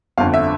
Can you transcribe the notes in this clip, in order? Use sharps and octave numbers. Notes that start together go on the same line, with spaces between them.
G1 F2 D3 F5
E5